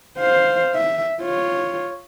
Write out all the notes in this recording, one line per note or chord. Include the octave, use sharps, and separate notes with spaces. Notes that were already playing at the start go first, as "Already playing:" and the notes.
C5 F5
E5
F4 C#5